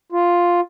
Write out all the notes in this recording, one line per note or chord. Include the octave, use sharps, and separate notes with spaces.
F4